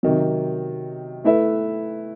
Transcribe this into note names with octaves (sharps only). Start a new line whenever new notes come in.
C3 D#3 F#3
A3 E4 B4 E5